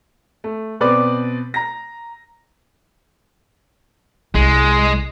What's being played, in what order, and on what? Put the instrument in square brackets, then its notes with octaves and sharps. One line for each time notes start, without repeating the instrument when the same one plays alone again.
[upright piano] A3
B2 C4 B4 D5 D6
A#5 A#6
[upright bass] C2 [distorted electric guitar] G#3